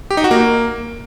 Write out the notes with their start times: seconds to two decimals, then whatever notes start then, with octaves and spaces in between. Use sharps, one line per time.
0.11 G4
0.17 D#4
0.24 F#4
0.31 A#3